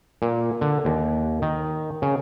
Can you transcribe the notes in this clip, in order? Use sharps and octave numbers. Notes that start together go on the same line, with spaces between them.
A#2
D3
D#2
D#3
C#3